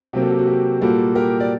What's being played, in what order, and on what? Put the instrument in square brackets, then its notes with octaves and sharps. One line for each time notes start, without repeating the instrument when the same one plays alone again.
[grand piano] C3 F#3 A#3 G4
F#4 A4
G4
F#4
G4
A#2 G3 A#3 F#4 A4
G4 A#4
D5